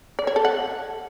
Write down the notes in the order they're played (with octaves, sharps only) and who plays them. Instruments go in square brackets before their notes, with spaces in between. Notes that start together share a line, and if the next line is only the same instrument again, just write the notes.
[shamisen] D5
C#5
A4
F#5